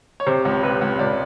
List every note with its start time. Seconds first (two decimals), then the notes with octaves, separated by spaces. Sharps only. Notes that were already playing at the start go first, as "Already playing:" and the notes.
0.20 C#5
0.26 C3 C5
0.45 C#2
0.63 C3 B4
0.81 C#2
0.99 C#2 D5